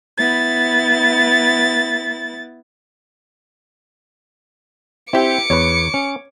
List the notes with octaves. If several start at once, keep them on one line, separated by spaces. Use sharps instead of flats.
B3 E4 A6
C4 E4 G4 D6 C#7
E2 B4 C#5
C#4